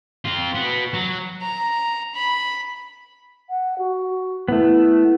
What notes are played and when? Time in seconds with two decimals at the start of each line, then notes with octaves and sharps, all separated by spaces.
0.25 C4 F4
0.55 B3 F#4
0.94 F#3
1.42 A#5
2.15 B5
3.49 F#5
3.78 F#4
4.48 A3 B3 E4